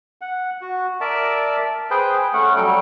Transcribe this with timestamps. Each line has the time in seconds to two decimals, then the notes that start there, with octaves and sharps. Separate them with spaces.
0.21 F#5
0.61 F#4
1.01 A#4 D5 E5 A5
1.91 G#4 B4 C5 G5
2.33 A3 C#4 F#5
2.56 F#3 G3 A4 G5